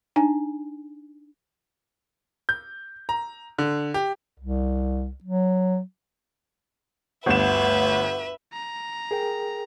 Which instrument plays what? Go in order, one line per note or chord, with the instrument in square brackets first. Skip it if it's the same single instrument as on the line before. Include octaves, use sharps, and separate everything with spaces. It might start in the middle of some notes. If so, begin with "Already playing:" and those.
[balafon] D4 D#4 G#5
[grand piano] G6
A#5
D3
G4
[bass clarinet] C2
F#3
[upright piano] G1 D2 E7 [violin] B4 E5
[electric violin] A#5
[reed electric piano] G#4 A#4 G5